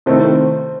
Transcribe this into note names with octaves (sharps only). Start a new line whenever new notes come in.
C3 D#3 A3 C4 E4 C5